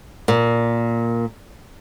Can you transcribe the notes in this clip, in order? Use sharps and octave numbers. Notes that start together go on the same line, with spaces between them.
A#2